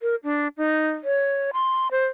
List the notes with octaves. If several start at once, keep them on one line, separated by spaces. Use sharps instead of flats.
A#4
D4
D#4
C#5
C6
C5